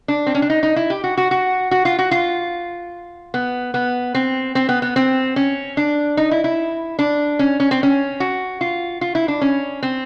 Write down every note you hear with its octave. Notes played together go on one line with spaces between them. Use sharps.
D4
C4
C#4
D4
D#4
D#4
E4
G4
F#4
F#4
F#4
F#4
F4
F#4
F4
B3
B3
C4
C4
B3
B3
C4
C#4
D4
D#4
E4
E4
D4
C#4
C#4
C4
C#4
F#4
F4
F4
E4
D4
C#4
C4